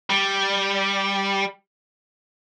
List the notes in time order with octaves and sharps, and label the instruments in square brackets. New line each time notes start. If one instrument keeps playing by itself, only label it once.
[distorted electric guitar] G3